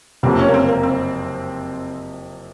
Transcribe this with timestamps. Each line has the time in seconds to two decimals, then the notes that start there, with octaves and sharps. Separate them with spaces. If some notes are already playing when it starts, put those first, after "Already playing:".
0.23 F#1 F2 C3 C4
0.39 C#4
0.49 A#3
0.54 C4
0.69 A#3
0.83 C4